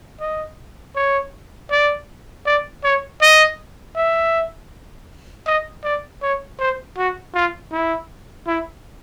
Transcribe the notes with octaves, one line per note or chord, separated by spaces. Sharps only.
D#5
C#5
D5
D5
C#5
D#5
E5
D#5
D5
C#5
C5
F#4
F4
E4
E4